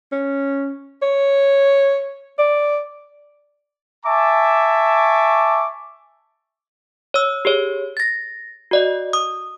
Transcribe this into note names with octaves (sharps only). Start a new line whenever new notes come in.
C#4
C#5
D5
E5 G#5 A5 C#6 D6
C#5 E6
G4 G#4 C#5
A6 A#6
F#4 D5 D#5
D#6